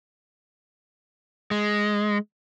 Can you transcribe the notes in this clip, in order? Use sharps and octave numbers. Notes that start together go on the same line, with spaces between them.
G#3